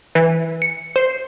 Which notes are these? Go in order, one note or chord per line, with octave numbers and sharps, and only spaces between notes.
E3
C#7
C5